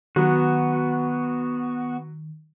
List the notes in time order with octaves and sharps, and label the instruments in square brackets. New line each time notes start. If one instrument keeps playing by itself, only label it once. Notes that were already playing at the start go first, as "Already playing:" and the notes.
[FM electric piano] D#3 [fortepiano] F#3 [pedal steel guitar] B3 F#4